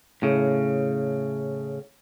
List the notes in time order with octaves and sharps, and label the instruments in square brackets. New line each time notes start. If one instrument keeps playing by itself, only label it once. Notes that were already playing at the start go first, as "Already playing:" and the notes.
[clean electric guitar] A2 C#3